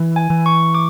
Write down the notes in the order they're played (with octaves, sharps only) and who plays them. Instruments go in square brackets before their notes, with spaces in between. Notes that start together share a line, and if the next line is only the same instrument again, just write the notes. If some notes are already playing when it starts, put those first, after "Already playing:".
Already playing: [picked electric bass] E3
[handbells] G#5
[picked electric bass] E3
[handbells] C#6
D6